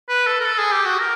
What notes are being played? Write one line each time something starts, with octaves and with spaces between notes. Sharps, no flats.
B4
A4
A#4
A4
G#4
G4
F#4
A#4